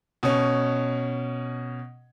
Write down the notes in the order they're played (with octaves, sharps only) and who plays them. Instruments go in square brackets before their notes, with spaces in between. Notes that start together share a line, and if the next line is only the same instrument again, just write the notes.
[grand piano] B2 C#4